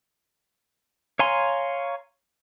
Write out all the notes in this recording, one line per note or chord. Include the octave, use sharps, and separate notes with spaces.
C#5 F5 G#5 A#5 C6